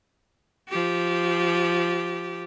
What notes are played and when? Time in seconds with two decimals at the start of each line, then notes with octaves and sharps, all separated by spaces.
0.69 F3 G4